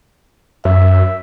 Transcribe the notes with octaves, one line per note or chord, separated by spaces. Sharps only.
F#2 E5